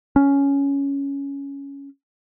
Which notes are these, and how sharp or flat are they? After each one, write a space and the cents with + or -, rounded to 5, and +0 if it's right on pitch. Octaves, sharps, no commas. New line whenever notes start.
C#4 +10